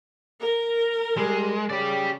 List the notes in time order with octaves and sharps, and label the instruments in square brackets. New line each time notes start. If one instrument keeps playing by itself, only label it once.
[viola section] A#4
[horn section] G3 [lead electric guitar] G#3
[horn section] C#3 [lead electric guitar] G4 D5